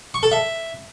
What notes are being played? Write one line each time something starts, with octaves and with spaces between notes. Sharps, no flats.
C#6
A4
E5